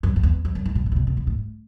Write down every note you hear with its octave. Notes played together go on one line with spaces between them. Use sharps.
F#2
F2
E2
F2
F#2
G#2
A#2
B2
C3
B2
B2
A#2
A2